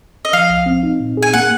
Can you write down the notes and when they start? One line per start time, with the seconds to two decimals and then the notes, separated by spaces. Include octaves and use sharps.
0.25 D#5
0.33 F3 F5
0.50 C2
0.66 C4
0.83 D#4
1.00 A#2
1.17 G#4
1.22 G#5
1.33 A#3 F#5